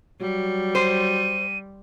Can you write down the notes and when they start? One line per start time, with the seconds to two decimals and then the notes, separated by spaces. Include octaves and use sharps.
0.21 F#3 G3
0.75 C5 D#7